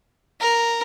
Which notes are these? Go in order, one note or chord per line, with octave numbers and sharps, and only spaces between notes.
A#4